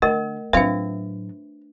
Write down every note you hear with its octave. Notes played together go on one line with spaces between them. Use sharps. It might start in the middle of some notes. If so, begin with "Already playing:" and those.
D3 A3 A#4 D#5
A2 F#3 C4 D4 F4 B4 E5